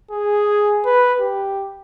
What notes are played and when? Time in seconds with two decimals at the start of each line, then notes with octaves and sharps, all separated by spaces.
0.11 G#4
0.85 B4
1.20 G4